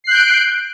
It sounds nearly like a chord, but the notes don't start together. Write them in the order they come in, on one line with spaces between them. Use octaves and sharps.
C7 F#6 G6 D7